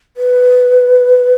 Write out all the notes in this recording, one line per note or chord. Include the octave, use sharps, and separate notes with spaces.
B4